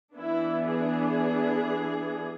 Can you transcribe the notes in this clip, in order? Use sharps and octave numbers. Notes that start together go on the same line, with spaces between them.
E3 B3 D4 E4
G#4